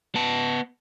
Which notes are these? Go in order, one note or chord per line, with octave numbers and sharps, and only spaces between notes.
B3 A5